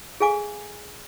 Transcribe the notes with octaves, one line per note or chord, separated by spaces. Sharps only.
G#4 A4 F5 G#5 D6